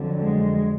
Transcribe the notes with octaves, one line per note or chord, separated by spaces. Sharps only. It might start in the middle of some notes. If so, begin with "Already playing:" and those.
Already playing: F2 D3 F#3
G#3